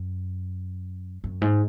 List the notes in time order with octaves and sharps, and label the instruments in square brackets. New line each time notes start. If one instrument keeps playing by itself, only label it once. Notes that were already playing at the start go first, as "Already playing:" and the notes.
Already playing: [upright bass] F#2
F#2
G#2